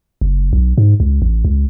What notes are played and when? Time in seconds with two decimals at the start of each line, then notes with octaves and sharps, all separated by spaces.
0.21 F#1
0.53 B1
0.78 G#2
1.00 C#2
1.22 A1
1.45 C#2